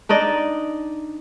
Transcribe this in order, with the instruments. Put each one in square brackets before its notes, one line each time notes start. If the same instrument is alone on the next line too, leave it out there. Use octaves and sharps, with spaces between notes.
[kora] D4 D#4 D5 D#5